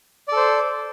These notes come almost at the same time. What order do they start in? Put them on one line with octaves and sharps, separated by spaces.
D5 A4 C5